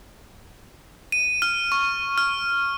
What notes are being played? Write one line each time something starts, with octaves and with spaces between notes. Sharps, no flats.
D#7
F6
C#6
F6